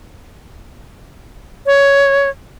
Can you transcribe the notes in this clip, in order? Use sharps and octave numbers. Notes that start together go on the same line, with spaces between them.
C#5